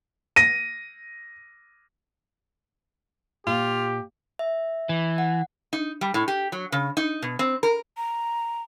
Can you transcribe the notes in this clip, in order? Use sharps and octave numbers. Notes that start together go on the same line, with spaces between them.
A#6 D#7
A#2 F4 G4
E5
E3
F#5
D#4
G3
A2
G4
F#3
C#3
D#4
B2
C4
A#4
A#5